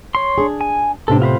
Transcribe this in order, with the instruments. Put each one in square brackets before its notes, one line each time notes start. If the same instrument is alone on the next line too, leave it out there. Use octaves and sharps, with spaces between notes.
[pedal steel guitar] C#5 C6
[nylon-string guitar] D4 G#4
[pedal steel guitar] G#5
[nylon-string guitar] A2 C3 B3 [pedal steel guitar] D4 A4
[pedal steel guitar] F4 B4 C5